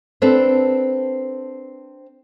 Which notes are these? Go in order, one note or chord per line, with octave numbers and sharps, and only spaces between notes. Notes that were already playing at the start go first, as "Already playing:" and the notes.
C4 D4 A4 B4 C5